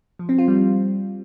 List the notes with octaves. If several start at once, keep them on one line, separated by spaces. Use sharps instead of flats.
F3
C4
F4
G3